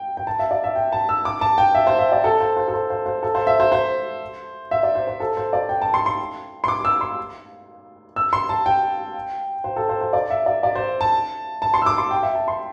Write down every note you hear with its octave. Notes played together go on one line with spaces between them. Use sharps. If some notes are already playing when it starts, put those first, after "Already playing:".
Already playing: G5
G5
A5
E5
D5
E5
G5
A5
E6
D6
A5
G5
E5
C5
E5
D5
A4
C5
C5
A4
C5
C5
C5
A4
C5
E5
C5
C5
E5
D5
C5
C5
A4
C5
D5
G5
A5
C6
C6
C6
D6
E6
C6
E6
C6
A5
G5
C5
A4
C5
C5
D5
E5
D5
D5
C5
A5
A5
C6
E6
D6
C6
G5
E5
A5
C6